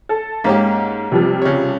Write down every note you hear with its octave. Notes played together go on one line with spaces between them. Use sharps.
A4
G#2 A#3 C#4 G4
C3 F3 G3
C#3 C#5